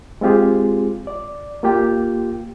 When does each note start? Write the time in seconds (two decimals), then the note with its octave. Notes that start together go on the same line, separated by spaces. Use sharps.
0.21 G#3 C4 F4 G4 G#4
1.07 D5
1.63 A#3 F4 G4 G5